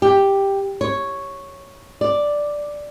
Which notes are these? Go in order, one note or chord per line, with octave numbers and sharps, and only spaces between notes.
G4
C#5
D5